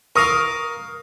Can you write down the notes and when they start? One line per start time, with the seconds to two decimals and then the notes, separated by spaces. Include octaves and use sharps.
0.16 A#4 F5 C#6 D#6